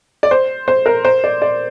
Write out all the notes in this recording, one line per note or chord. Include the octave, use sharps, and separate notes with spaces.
D5
C5
C5
A#4
C5
D5
D5